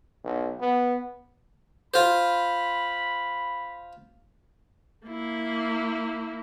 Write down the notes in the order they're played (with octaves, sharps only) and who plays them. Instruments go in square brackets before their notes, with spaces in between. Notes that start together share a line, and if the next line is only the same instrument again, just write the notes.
[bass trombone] B1
B3
[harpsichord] F4 C5 [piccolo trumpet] B5
[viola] A#3 E4